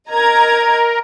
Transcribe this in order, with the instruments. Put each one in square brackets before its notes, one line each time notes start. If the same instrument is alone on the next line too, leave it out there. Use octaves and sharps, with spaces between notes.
[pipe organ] A#4 [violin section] D#5 A#5 G#6